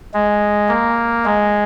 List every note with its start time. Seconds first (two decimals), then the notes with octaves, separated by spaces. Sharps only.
0.14 G#3
0.69 A#3
1.25 G#3